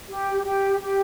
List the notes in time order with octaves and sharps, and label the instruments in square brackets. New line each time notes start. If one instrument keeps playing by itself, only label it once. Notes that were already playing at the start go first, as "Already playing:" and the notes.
[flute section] G4
G4
G4